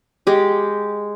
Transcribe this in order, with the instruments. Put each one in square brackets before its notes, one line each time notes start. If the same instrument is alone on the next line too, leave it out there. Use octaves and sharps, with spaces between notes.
[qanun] G#3 G4